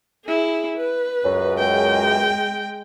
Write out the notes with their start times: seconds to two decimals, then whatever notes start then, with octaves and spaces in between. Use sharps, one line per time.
0.25 E4 G#4
0.77 B4
1.25 C#2 F#2
1.58 G#3 G5